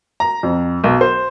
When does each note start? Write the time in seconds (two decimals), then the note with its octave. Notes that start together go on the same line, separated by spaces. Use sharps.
0.20 A#5
0.43 F2
0.84 B1
1.01 C5